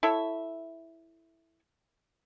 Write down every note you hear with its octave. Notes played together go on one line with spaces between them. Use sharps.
E4 A4 C#5 E5